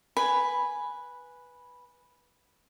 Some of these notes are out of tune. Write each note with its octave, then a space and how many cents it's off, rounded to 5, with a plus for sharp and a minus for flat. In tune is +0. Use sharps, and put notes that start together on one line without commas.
B4 -5 G#5 +0 B5 +0